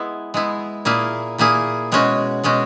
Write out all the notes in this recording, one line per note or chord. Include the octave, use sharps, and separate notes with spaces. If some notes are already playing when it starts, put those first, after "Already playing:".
Already playing: G#3 B3 E4
G#3 B3 E4
A#2 A#3 E4 G#4
A#2 A#3 E4 G#4
B2 G#3 C#4 F#4
B2 G#3 C#4 F#4